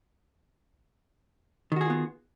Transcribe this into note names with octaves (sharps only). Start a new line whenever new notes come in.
D#3 B3 F4 F#4 G#4